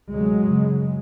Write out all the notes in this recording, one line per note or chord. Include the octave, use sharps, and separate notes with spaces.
D2 C3 F#3 G#3
F#2 C#3